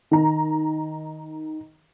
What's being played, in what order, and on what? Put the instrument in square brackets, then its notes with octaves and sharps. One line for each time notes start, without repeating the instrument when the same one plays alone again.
[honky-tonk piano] D#3 A#5